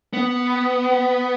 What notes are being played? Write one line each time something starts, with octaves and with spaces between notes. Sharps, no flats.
B3